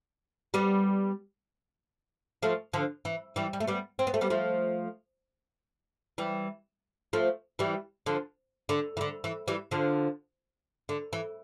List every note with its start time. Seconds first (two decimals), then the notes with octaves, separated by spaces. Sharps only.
0.54 G3 B3
2.42 F3 A3
2.73 D3 F3
3.05 E3
3.36 E3 G3
3.53 G3
3.60 A3
3.68 G3 B3
3.99 C4
4.07 B3
4.14 A3
4.21 G3 B3
4.30 F3 A3
6.18 E3 G3
7.13 F3 A3
7.59 E3 G3
8.06 D3 F3
8.69 D3
8.97 E3
9.01 D3
9.24 E3
9.48 E3 G3
9.71 D3 F3
10.89 D3
11.13 E3